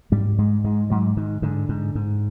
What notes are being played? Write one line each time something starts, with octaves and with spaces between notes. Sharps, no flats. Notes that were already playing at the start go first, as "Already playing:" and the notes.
G#2 G3
G#2 G#3
G#2 G#3
G#2 F#3
G#2 D#3
G#2 D3
G#2
G#2